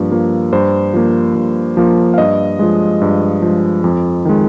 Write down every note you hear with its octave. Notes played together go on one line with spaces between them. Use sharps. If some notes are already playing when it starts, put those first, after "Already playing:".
Already playing: G2 F3 A#3
F3 A#3
G2 C5
F3 A#3
G2
F3 A#3
F5
G2 D#5
F3 G#3
G2
F3 G#3
F2
D#3 G#3